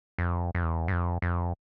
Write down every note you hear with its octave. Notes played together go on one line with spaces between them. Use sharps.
F2
F2
E2
G2
F2
F2